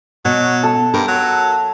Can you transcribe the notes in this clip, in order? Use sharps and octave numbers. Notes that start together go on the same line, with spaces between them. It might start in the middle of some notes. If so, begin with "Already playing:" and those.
B2 F#3
A4
G2 A#4
F#3